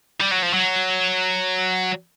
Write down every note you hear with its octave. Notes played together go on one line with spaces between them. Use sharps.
G3
F#3
F3
F#3